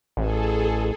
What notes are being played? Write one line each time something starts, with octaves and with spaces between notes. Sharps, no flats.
A1 G#4 A4